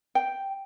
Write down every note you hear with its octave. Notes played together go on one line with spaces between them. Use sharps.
G5